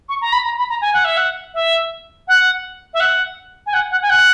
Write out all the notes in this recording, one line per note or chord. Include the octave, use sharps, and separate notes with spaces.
C#6
A#5
B5
A#5
B5
A#5
G#5
F#5
E5
F#5
E5
F#5
E5
F#5
G#5
F#5
F#5
G#5
F#5